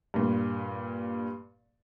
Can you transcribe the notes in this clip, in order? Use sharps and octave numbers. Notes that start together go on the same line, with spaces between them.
G2 A#2